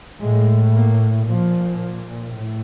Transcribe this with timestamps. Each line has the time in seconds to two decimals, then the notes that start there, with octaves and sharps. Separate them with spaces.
0.20 A2 G#3
0.73 A#3
1.26 A#2 F3
2.33 A2